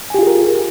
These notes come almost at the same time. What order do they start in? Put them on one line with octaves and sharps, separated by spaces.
G#5 G4 F4 G#4 A#4